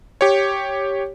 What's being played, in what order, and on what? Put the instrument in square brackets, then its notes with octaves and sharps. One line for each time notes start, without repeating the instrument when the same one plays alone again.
[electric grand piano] G4 C#5